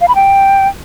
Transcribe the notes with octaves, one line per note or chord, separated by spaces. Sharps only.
F5
B5
G5